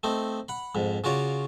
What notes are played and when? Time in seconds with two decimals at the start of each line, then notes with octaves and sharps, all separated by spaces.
0.03 A3 C4 D#4
0.49 F#5 B5
0.75 F2 G#2
1.04 C#3 F4 F#4 C#5 D5